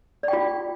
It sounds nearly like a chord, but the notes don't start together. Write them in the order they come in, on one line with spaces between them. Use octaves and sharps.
D5 G5 F4